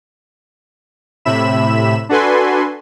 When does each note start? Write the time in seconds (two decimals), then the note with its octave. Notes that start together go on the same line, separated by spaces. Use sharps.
1.25 A2 C3 E5 B5 E7
2.09 D4 F#4 A4 B4 G#5 C6